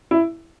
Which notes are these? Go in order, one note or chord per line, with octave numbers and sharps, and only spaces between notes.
E4